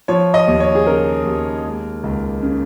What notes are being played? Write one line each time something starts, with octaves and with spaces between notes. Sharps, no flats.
F3 C#5
D#5
D#2
C#5
G#4
C#3 A#4
D#2
G#3
C#2
C#3